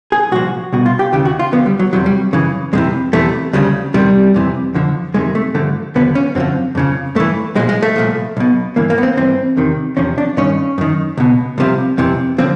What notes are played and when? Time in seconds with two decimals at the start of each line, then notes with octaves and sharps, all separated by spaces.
0.12 G#4
0.32 C2 A#2 F3 F#4
0.73 C2 B2 F#4
0.86 F4
0.99 G4
1.12 D#2 C#3 E3 G4
1.25 F#4
1.39 F4
1.52 D2 D3 F3 B3
1.66 G3
1.79 F#3
1.93 E2 C3 E3 F#3
2.06 G3
2.33 F#2 C#3 E3
2.73 F2 C3 E3 G#3
3.13 E2 C3 E3 A3
3.53 D2 C#3 F3 G3
3.94 E2 C3 D#3 G3
4.34 F2 C3 E3
4.74 F2 D3 F3
5.14 F2 C3 D#3 G#3
5.35 A3
5.55 G2 D3 F3 A3
5.95 D#2 D3 F3 B3
6.15 C#4
6.35 F#2 D3 F3 C4
6.75 F2 C#3 F3
7.15 G2 E3 A3
7.55 B1 A#2 F3 G#3
7.69 G#3
7.82 A3
7.96 C2 A#2 F3
8.37 B1 B2
8.76 G2 E3 A#3
8.90 A#3
8.98 B3
9.03 C4
9.17 G2 E3 C4
9.57 E2 C3 D#3
9.97 E2 C3 F3 C#4
10.18 D4
10.37 G2 D#3 C#4
10.78 F#2 D#3
11.17 C#2 B2
11.58 C2 C3 F3
11.98 F2 C3 E3
12.38 D3 F3 C4